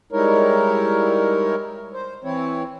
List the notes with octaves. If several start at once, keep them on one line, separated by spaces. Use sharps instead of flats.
G3 G#3 D#4 E4 A#4 C#5
C5
E3 C4 E4 C#5